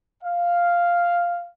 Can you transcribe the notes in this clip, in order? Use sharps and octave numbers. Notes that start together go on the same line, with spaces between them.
F5